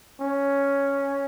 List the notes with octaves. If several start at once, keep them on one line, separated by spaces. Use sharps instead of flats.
C#4